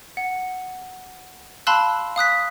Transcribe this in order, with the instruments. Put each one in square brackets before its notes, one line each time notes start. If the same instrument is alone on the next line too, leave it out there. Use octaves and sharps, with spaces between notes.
[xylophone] F#5
F5 A5 B5 C6 E6 F#6
F5 D#6 F#6 B6